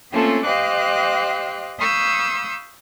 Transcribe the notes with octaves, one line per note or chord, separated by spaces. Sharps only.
A3 A#3 C4 C#4 F4 A4
G4 C5 D#5 F5 D6 F#6
F5 B5 C#6 D#6 E6 G6